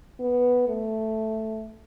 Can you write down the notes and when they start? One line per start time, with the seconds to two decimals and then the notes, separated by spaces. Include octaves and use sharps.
0.20 B3
0.68 A3